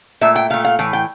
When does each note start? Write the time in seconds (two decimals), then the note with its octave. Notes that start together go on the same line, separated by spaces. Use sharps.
0.21 A#2 A3 E5
0.36 G5
0.50 A#2 A3 F5
0.65 F5
0.79 A2 E3
0.93 G5